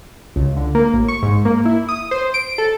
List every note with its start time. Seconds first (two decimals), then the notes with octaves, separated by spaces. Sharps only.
0.36 C#2
0.57 D3
0.75 A#3
0.93 A1
1.08 C#6
1.23 G#2
1.45 A#3
1.65 E4
1.89 D#6
2.11 C5
2.34 D7
2.58 A4